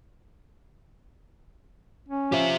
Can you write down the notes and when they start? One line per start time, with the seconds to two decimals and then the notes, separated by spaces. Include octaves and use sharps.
2.09 C#4
2.32 F3 G4 E5